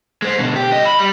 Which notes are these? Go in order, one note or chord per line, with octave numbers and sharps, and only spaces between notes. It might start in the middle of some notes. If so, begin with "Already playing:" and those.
G#3 C5
B2 D3
G4
G2 D#5
B5
G3